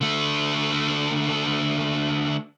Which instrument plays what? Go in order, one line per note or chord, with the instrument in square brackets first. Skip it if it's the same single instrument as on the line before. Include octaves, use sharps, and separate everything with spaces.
[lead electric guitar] D3 A3